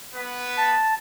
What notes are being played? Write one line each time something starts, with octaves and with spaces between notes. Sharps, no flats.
B3 B4
A5